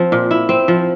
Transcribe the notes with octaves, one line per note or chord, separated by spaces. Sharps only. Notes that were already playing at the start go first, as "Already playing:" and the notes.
Already playing: F3 C4
A#2
E4
C4
F3